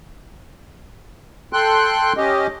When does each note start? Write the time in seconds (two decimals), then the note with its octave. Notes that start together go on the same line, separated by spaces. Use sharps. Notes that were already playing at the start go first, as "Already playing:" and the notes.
1.53 A4 G5 C6 F#6
2.17 C#4 G4 D#5